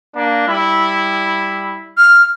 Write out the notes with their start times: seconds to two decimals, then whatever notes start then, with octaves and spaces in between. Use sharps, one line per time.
0.15 A#3 D4
0.48 G3 E4
1.97 F6